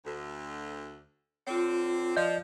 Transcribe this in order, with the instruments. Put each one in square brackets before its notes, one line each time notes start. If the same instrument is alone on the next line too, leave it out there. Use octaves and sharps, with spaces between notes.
[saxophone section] D2
[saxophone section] D3 C4 [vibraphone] F4 C#5
[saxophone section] F3 [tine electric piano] D5 D#5 G6